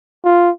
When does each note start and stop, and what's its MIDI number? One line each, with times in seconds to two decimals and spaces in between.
0.24 0.50 65